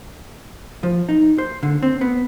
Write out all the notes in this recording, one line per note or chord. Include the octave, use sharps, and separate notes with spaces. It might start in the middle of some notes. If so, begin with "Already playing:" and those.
F3
D#4
C5
D3
C4
B3